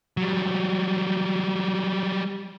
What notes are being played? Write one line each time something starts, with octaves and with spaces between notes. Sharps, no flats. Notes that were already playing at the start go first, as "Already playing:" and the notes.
F#3 G3